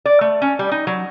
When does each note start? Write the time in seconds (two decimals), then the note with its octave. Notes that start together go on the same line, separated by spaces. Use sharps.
0.05 D5
0.21 A3
0.42 C#4
0.59 G3
0.72 D#4
0.87 F#3